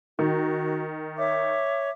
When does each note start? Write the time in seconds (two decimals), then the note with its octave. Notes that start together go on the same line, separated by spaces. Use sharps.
0.19 D#3 F#4
1.17 C#5 E5 D6